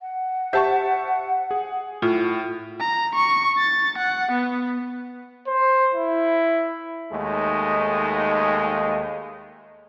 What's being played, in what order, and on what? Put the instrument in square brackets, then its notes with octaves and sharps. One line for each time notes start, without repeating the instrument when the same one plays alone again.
[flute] F#5
[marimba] G4 C5 G6 [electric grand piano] E5 A5 C#6
[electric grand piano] G#4
[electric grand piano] A2 [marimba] F4
[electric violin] A#5
C#6
A6
F#5
B3
[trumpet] C5
E4
[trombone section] D#2 G#3 A3 D#4